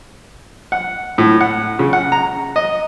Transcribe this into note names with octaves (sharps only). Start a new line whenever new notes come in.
F#5
A2
F#5
C#3
F#5
A#5
D#5